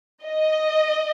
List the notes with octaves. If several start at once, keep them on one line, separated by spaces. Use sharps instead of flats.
D#5